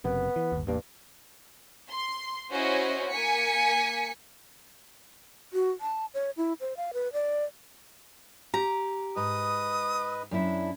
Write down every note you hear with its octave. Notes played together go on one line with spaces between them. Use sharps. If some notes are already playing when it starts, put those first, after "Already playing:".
F#1 F#2 C3 B3
E3
G1 D#2
A1 E2 G2 A#3
C6
C#4 E4 F#4 C5 C#5 D#5
A#3 G#5 B6 C#7
F#4
A5
C#5
E4
C5
F5
B4
D5
G4 A#5
G#2 B4 D#5 D#6
F#2 D4 E4